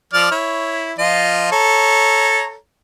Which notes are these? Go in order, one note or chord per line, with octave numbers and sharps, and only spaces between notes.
F3 D5 F6
E4 C#5
F3 F4 D#5
A4 C#5 A#5